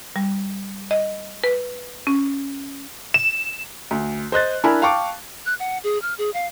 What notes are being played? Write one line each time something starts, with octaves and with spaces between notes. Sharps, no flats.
G3
D#5
B4
C#4
E7
D2
C5 D#5 F#6 A6
D4 E4 A#4 G#5 B5
F5 G5 A5 C#6 D6
F#6
F#5
G#4
F6
G#4
F5